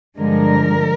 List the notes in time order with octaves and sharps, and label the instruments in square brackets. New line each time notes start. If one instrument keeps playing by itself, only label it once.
[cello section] G2 D3 F3 G#3 A#4